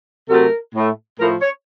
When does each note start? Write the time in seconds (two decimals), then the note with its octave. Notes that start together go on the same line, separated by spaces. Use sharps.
0.29 C3 F#3 A3 A#4
0.74 A2
0.79 A3
1.19 A2 F3 A3 A#4
1.41 C#5